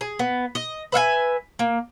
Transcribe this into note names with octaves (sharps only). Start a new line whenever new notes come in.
G#4
B3
D#5
B4 E5 F5 G#5
A#3